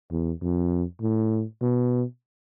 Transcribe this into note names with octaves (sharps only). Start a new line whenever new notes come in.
E2
F2
A2
B2